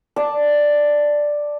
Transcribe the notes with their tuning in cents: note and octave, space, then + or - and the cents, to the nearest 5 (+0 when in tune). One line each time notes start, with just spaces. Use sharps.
D5 +5 A5 +0